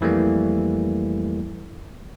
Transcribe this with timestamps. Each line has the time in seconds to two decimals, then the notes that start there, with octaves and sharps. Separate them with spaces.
0.01 F2 E3 G3 A3 A#3